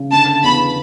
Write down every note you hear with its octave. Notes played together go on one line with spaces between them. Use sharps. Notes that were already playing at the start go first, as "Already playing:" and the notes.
Already playing: C#3
D3 A5
E2 B5